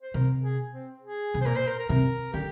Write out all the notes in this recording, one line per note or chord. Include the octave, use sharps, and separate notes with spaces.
C5
C3 A#4
G#4
C4
G#4
C3
C5
A#2 A#4
C5
A#4
A#4
C3 A#4
D3 G4